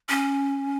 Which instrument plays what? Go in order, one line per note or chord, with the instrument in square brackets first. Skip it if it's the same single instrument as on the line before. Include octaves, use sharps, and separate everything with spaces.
[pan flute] C#4